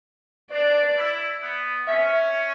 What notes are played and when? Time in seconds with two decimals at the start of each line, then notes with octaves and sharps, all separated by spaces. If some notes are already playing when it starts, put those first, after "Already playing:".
0.51 D4 D5
0.96 E4
1.42 B3
1.88 C#4 E5